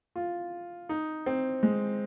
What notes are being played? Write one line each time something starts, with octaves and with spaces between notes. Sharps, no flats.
F4
D#4
C4
G#3